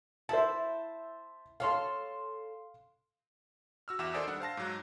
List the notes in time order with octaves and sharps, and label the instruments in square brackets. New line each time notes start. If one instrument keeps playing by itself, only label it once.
[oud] E4 [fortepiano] C5 E5 A5
[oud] A4 C#5 [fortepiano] F5 C6
[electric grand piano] F#4 E6 F6
E2 F#4 E5 D6 E7
D#3 A4 C5 D5 G#5 D#6
G3 D4 F#5
C5 F5 A5 A#6
G#2 F#3 F#6